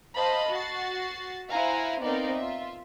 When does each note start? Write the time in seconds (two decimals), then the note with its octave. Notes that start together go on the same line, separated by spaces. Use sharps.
0.16 C5 D#5 F5 A5 B5
0.50 F#4 A6 C7
1.50 E4 C5 F5 F#5 G#5 A#5
2.02 B3 C4 D#4 A#4 D5 F5
2.38 F4 E5